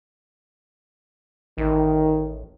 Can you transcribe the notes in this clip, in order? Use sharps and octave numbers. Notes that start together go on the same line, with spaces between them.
A1 D#3